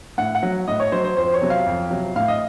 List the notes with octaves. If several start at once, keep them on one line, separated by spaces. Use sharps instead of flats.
A2 F#5
F#5
F#3
A2 D#5
C#5
F#3 C5
C5
F2 C5
C#5
C3 F#3
F5
F2
C3 F#3
A2 F5
D#5